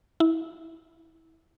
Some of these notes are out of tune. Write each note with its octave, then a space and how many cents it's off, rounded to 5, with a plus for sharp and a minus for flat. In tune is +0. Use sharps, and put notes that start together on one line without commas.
E4 -25